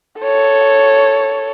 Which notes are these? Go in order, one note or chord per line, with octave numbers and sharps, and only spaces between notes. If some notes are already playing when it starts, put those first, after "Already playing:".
A4 C#5